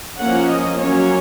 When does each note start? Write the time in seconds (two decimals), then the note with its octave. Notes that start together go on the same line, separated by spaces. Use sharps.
0.21 F3 A#3 C#4 F#5
0.51 D#5
0.81 F#3 A#3 C#4 C#5